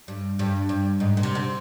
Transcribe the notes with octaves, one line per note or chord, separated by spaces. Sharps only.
G2
G2
G2
G#2
A#2
C3
D3